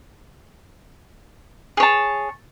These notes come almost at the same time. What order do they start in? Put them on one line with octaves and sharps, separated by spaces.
G#4 C#5 A5